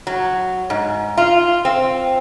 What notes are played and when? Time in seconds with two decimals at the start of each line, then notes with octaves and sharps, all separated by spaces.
0.07 F#3
0.70 G#2
1.17 F4
1.65 C4